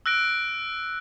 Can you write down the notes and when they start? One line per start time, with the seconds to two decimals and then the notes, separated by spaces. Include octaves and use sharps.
0.06 E6 F#6 A#6 D7